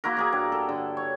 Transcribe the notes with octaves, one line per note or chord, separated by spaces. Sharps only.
A#3 E4 F#4 A#4
G#4 A#4 D5
G2
A4
D3
C#5